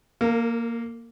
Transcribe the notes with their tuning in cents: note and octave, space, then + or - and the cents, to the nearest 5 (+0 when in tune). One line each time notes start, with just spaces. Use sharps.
A#3 +0 A#4 -40